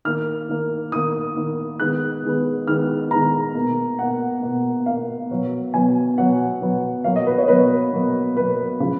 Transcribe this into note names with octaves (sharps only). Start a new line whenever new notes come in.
D#3 A#3 F6
D#3 A#3
D#3 A#3 D#6
D#3 A#3
D#3 G#3 B3 F#6
D#3 G#3 B3
D#3 G#3 B3 F6
D#3 G#3 B3 A#5
B2 A#3
B2 A#3 F#5
B2 A#3
B2 A#3 F5
B2 F#3 B3
B2 F#3 B3 G#5
B2 F#3 B3 F#5
B2 F#3 B3
B2 F#3 A#3 F5
D#5
B4
C#5
B2 F#3 A#3 B4
B2 F#3 A#3
B2 F#3 A#3 B4
C#3 F3 G#3 B3